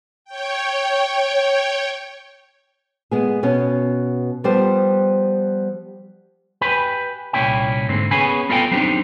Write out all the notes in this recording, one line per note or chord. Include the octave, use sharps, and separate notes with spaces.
C#5 G5
G#3 B3 G#4
B2 B3 C#4
F3 G3 B3 G4 B4 C5
G4 B4 G#5 B5
C2 A#2 C#4 E4 G5
G#2 D3 C4
B3 C#4 G#4 G#5 B5
B3 F4 A4 D#5 F5 G5
F#3 C4 D4 D#4 G4